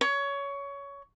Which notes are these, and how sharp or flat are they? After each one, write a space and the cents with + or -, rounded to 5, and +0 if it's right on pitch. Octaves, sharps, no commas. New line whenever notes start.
C#5 +20